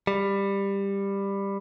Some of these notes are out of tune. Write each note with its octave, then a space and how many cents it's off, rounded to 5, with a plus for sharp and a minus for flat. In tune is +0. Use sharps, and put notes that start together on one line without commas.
G3 +15